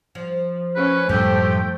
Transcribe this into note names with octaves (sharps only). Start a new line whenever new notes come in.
F3
C#4 B4
F#2 A2 F3 G3 A3 G4 G5